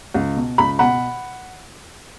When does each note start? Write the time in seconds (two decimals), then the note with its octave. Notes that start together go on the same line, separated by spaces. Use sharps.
0.14 C#2
0.36 B2
0.58 C#2 B5
0.79 B2 F#5 B5